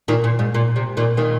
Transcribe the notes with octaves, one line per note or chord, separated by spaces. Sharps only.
A#2 D#3
A#2
G#2
A#2
C3
A#2 D#3
A#2 D#3